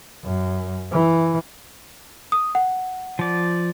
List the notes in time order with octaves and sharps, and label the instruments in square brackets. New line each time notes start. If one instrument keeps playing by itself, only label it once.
[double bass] F#2
E3
[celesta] D#6
F#5
[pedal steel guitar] F3 D5